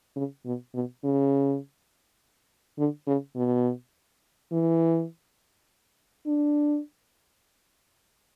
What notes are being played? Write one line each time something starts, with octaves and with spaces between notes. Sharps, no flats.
C#3
B2
B2
C#3
D3
C#3
B2
E3
D4